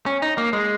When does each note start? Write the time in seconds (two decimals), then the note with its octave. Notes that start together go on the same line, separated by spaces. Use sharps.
0.06 C#4
0.22 D#4
0.38 A#3
0.53 G#3